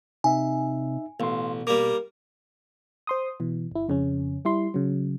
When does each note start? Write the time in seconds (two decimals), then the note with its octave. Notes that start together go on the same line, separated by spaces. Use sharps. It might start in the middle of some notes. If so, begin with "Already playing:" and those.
0.24 C3 D#4 E5 G#5
1.20 A1 B2 F5 C6
1.67 G3 A#3 D6
3.07 C5 C6 D#6
3.40 B2 E3
3.72 G1 E4
3.88 F2 C#3 C#4
4.45 G3 E4 C6
4.74 C#3 F#3